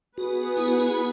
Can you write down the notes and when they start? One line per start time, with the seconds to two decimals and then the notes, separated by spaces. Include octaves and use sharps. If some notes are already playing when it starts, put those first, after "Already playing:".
0.18 B3 F#4 G#4 B4
0.57 E4
0.68 F#4
0.80 E4